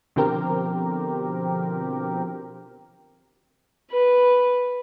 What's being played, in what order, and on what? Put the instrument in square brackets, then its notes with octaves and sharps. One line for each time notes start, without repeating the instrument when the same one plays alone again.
[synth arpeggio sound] B2 D3 F3 C4 G4 A#4
[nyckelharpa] B4